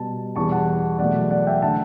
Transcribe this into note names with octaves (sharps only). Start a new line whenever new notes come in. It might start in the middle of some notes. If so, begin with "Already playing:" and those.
Already playing: B2 G3 A5
E2 B2 G3 A5 C#6
F#5 A5
E2 B2 F#3 A3 D5 F#5
D5 F#5
E5 G5
D3 A3 F#5 A5